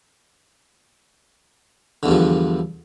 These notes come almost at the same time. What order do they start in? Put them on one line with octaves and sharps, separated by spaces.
D3 E2 G2 F3